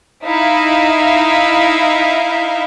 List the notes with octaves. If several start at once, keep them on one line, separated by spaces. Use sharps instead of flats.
D#4 E4 E5 F5